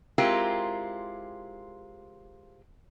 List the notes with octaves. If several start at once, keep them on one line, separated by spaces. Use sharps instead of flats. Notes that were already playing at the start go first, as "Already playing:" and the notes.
G#3 C4 E4 F4 G4 A#4